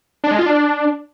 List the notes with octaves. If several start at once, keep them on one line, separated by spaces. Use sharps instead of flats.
D4
G#3
F4
D4